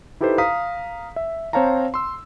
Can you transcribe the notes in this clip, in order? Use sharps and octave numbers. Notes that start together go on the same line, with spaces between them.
D#4 E4 G4 A4 B4 C5
F5 A#5 D#6 B6
E5
C4 C5 C#5 F5 A5 A#5
C6 E6